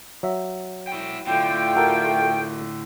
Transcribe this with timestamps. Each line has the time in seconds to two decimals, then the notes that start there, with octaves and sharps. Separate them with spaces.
0.23 F#3 E5
0.87 E4 G5
1.27 A2 D3 A3 F4 G5
1.75 F#4 A4 A#4